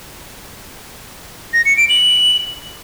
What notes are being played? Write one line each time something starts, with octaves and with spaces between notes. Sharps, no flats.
A#6
C#7
D7
F#7